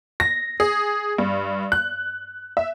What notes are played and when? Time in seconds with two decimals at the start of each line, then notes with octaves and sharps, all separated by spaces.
0.20 A#6
0.60 G#4
1.18 G2
1.72 F#6
2.57 E5